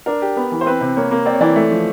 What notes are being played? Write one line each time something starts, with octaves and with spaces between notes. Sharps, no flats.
D4 A#4
G4
B3
E3
C5
C4 B4
C3
A#3 C#5
A#3
C4 D5
C#5
E3 D5
A3
F3